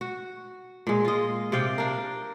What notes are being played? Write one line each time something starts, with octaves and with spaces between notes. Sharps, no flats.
F#4
A#2 G#3
F4 D#5
C3 D5 F5 G5
D4 A#4